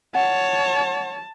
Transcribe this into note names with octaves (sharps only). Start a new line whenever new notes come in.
C#5 F#5 A5